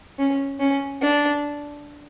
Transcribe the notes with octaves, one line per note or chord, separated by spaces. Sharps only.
C#4
C#4
D4